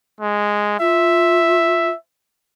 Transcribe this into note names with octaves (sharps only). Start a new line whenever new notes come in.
G#3
F4 E5